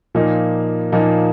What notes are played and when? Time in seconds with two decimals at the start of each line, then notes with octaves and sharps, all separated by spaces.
0.15 A#2 F3 A#3 D#4
0.92 A#2 F3 A#3 D#4